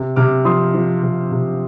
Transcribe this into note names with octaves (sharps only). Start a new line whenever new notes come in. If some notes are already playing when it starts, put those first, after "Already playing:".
Already playing: C3
C3 D6 F6
F3 C6 D#6
F3
C3
C3